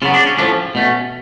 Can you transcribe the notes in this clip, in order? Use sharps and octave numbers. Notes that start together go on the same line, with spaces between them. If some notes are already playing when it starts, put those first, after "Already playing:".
C#3 F#3 B3 F4
D4
C#4
A2 F3 A3 C#4 D4
B2 A3 C#4